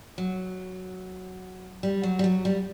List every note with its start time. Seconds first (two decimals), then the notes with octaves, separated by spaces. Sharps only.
0.18 F#3
1.83 G3
2.03 F#3
2.19 G3
2.24 F#3
2.45 G3